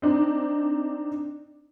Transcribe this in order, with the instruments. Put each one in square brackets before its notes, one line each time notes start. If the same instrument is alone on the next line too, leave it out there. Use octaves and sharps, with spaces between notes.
[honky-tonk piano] C4 D4 D#4